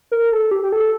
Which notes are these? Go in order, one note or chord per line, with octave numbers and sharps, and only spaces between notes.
A#4
A4
G4
G4
A4